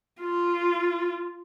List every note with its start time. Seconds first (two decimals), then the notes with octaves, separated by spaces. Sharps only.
0.21 F4